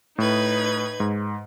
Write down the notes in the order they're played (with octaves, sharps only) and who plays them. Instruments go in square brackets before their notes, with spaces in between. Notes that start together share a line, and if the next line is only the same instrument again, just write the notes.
[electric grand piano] A2 [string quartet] D#4 B4 G#6
[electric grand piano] G#2